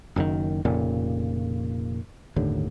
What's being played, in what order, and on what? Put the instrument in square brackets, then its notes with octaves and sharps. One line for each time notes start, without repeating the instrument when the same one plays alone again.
[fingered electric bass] F#1 F#2 A#2 D#3
F1 F2 A#2 C#3
G1 D#2 A2 D3